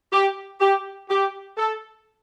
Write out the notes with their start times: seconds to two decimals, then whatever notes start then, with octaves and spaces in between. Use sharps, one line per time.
0.11 G4
0.59 G4
1.09 G4
1.57 A4